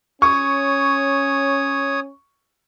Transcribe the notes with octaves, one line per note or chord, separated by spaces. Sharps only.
C#4 C#5 C#6 D#6